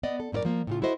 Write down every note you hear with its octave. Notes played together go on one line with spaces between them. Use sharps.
B3 D5 D#5
A4
F#2 A2 E4 A#4 D5
F3 A#3
A2 C#3 F4
E4 F#4 A4 C5 D#5 E5